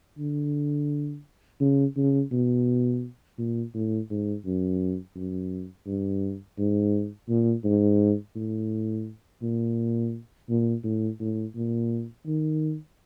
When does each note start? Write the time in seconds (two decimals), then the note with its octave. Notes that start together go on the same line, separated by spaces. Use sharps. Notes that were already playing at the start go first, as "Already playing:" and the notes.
0.19 D3
1.60 C#3
1.97 C#3
2.32 B2
3.39 A#2
3.74 A2
4.10 G#2
4.46 F#2
5.15 F#2
5.86 G2
6.58 G#2
7.29 A#2
7.64 G#2
8.35 A2
9.42 A#2
10.49 A#2
10.84 A2
11.20 A2
11.55 A#2
12.26 D#3